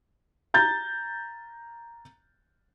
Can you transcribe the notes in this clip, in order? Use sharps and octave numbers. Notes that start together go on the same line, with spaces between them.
A#5 G6 A6